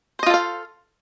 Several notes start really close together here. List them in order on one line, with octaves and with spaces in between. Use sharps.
C5 D#5 F4 A4 F5